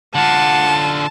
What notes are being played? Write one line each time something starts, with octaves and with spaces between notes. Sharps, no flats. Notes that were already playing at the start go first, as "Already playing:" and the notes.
D3 F4 F#5 A5